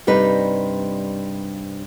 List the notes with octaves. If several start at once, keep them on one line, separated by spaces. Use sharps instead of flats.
G2 C3 G3 D#4 B4